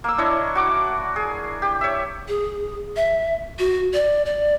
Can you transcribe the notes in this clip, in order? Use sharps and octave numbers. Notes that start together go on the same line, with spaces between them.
A#3 E6
D4 E4 C#5 D#5
F#4 D6
G#4
G4
C#5 E5
G#4
E5
F#4
D5
D5